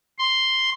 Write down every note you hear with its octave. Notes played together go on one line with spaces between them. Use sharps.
C6